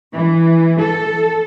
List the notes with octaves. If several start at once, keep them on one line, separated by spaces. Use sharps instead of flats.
E3
A4